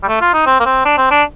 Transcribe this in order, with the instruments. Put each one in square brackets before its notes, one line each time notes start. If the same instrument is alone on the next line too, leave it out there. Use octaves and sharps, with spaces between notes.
[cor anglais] G3
A3
F4
D#4
C4
A#3
C4
D4
C4
D4